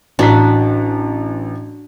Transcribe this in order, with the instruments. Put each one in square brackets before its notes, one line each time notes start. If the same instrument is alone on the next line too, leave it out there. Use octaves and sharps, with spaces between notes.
[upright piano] A1 A#5 B6 [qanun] D4 F#4